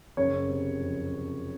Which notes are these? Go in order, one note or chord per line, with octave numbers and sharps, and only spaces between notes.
F#1 C#5
C3
F2
C3